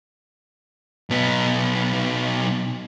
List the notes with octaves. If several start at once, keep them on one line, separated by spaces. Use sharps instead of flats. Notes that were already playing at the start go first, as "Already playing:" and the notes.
B1 B3